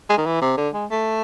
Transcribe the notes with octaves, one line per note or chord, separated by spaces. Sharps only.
G#3
D#3
E3
C3
D3
G#3
A3